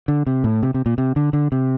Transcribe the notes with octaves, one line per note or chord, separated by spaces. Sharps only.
D3
C3
A2
C3
C3
A#2
C3
D3
D3
C3